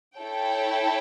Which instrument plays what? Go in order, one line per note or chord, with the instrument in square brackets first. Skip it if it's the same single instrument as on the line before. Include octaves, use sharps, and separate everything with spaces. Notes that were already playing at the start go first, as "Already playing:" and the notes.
[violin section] E4 A4 C#5 G5